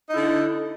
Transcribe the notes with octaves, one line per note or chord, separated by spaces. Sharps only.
D3 D#4 E4